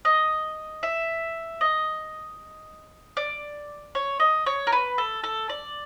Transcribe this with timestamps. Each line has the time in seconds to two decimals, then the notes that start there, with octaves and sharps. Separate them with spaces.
0.05 D#5
0.83 E5
1.61 D#5
3.17 D5
3.95 C#5
4.20 D#5
4.46 C#5
4.67 A#4
4.72 B4
4.98 A4
5.24 A4
5.49 D5